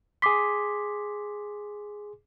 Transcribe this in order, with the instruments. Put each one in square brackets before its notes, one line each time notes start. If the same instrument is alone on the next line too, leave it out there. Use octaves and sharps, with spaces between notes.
[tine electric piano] G#4 C6 [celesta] D6 B6